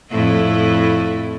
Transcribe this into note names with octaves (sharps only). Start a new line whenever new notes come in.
F2 A2 E4